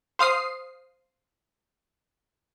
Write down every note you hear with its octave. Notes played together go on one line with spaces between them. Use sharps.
C5 F5 D#6 C7